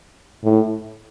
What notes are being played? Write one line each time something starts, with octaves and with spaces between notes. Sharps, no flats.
A2